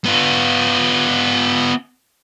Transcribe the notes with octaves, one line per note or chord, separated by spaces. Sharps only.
B3 F4